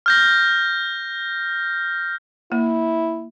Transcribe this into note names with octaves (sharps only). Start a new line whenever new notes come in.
F6 G6 A#6
A#3 E4